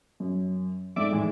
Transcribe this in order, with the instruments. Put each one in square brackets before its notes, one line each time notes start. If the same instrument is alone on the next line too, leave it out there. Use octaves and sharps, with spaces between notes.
[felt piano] F#2
[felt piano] F2 G#2 [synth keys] D5 E5 D6
[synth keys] A2 E3 G#3